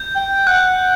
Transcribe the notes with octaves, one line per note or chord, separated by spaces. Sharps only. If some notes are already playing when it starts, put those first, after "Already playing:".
Already playing: G6
G5
F#5 F#6